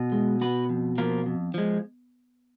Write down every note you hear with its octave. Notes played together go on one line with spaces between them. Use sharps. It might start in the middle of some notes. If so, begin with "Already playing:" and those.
Already playing: B2
G#3
B3 F#4 B4
F2
F3 A#3 F4 A#4
F2
F3 G#3